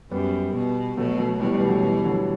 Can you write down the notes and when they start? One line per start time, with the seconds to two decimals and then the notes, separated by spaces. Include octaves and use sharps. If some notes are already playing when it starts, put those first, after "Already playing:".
0.11 F#2 G3 B3
0.54 B2
0.97 B2 F#3 A3
1.19 F#3 A3
1.40 B2 E3 G3
1.55 E3 G3
1.69 F#3 A3
1.83 E3 G3
2.04 D3 F#3